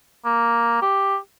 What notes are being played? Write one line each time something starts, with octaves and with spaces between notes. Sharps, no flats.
A#3
G4